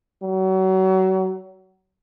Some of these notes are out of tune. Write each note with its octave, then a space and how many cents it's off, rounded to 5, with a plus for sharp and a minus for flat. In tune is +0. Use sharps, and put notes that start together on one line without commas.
F#3 +30